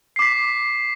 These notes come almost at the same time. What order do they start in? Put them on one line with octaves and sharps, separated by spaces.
C7 D6 B6